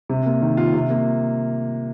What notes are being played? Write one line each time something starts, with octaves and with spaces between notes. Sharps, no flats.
C3
A#3
D#3
F4
C3
A#3